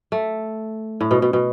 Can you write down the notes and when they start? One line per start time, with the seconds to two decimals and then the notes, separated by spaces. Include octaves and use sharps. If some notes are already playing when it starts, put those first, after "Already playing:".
0.12 A3
1.01 A2
1.11 B2
1.22 B2
1.33 B2